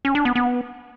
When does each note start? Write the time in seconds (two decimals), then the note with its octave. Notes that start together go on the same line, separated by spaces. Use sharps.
0.05 C#4
0.15 D4
0.25 B3
0.36 B3